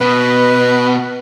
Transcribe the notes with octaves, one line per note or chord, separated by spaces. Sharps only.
B2 B4